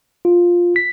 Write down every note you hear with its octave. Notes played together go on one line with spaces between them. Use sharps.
F4
B6